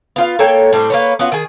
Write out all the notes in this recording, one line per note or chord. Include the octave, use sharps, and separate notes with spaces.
B3 F4 F5
A#3 A4 C#5 G5
A2 G3 C4
A#3 B4 C#5
B3 C#4 F4 F#4
D#3 G#4